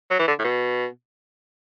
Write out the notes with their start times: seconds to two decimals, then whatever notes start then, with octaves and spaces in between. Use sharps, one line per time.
0.11 F#3
0.19 E3
0.28 D3
0.39 A2
0.45 B2